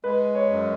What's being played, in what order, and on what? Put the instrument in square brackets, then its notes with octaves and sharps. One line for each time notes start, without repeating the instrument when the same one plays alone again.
[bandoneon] G#3 [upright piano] B4
[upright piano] C#5
[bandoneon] F#2